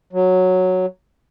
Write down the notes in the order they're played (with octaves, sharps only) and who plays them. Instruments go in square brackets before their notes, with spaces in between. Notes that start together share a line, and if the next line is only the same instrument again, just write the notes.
[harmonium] F#3